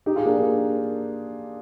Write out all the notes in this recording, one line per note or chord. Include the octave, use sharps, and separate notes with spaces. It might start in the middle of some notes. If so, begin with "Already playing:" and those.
D#4 G4
F4 G#4
A#3 D4
A#3